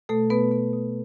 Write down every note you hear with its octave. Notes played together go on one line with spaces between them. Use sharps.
B2 A3 A4
B2 B3 B4
B3
B2